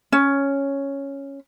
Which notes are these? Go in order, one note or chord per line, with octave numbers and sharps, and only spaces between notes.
C#4